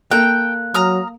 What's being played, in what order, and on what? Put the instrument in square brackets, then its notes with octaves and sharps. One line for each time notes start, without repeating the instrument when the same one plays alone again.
[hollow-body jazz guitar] A#3 A4 [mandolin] G5 [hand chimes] F#6
[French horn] F#3 [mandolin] A#5 D#6 F6